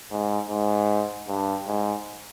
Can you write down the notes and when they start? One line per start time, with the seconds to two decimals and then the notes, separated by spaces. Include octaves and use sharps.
0.11 G#2
0.49 G#2
1.28 G2
1.67 G#2